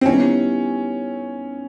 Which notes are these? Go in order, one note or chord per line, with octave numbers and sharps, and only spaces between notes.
C4
D#3 G3 B3 C#4 E4 G4